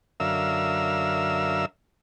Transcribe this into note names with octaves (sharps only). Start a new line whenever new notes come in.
F#2 D3 A#4 E5 F5 E6